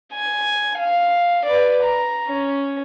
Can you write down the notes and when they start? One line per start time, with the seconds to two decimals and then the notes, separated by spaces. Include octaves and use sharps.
0.14 G#5
0.78 F5
1.46 B4 D5
1.83 A#5
2.28 C#4